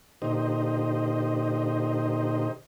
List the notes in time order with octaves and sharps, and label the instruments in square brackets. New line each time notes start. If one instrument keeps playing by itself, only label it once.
[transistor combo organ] A#2 D3 D#4 G4 C5 D#5